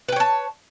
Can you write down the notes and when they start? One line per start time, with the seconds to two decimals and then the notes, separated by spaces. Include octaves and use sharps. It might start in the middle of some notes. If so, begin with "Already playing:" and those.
0.08 B4
0.12 G5
0.16 C#5
0.20 A5